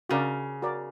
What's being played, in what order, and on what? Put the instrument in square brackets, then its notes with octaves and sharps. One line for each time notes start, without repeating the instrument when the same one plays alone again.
[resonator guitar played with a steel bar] C#3 [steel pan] F#4 A#4 D5
[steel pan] F#4 A#4 D5